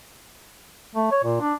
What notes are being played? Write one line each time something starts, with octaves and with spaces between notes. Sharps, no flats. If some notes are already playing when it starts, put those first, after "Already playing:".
A3
C#5
A#2
D4